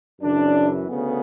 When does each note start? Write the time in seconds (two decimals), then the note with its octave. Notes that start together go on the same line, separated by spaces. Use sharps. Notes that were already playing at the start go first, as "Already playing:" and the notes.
0.20 F#2 C#3 E3 D4
0.89 D2 C#3 B3